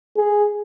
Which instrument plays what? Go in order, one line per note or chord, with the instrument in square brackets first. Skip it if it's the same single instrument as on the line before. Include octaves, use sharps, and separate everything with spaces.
[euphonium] G#4